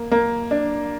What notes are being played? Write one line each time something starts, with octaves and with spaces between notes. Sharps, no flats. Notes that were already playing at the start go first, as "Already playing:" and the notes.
Already playing: A#3
A#3
D4